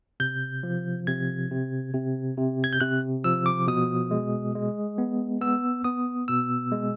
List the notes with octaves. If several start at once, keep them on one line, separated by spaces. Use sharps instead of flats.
C3 G6
F3
C3 G#6
C3
C3
C3
G#6
G6
C3 F#6
F3 E6
D6
B2 D#6
G#3
G#3
B3
B3 E6
B3 D#6
B2 E6
G#3